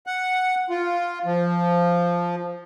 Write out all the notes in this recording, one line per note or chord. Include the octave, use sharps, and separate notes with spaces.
F#5
F4
F3